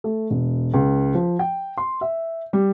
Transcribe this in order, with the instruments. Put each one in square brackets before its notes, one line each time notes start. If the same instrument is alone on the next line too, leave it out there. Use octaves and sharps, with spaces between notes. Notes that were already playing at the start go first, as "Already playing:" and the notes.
[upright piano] A3
E1
C#2
F3
G5
C6
E5
G3